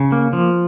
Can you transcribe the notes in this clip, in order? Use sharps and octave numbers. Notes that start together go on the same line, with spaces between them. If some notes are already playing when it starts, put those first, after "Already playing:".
Already playing: C#3
A#3
F3